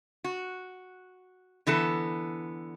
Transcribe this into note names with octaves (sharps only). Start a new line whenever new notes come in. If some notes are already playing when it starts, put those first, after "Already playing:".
F#4
D3 E3 B3 A4